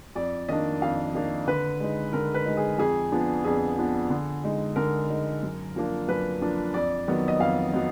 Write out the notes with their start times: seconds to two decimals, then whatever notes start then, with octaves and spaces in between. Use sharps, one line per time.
0.16 F2 D5
0.49 D#3 A#3 D4 D#5
0.82 F2 F5
1.14 D#3 A#3 D4
1.48 D3 B4
1.80 G#3 D#4
2.13 D3 A#4
2.34 B4
2.45 G#3 D#4
2.57 G#4
2.78 F2 G#4
3.12 F3 B3 D4
3.44 F2 G#4
3.78 F3 B3 D4
4.10 D3
4.44 G#3 D#4
4.76 D3 A#4
5.10 G#3 D#4
5.43 F#2
5.76 F3 A#3 D4
6.08 F#2 B4
6.42 F3 A#3 D4
6.74 F2 D5
7.08 D#3 F#3 B3
7.28 D#5
7.40 F2 F5
7.73 D#3 F#3 B3